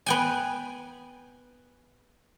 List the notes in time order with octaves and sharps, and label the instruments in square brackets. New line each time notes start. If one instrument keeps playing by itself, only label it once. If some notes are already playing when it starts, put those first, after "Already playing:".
[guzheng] B3 G5 G#5